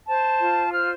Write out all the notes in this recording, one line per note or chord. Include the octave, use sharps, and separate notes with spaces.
C5 A5
F4
C5 F6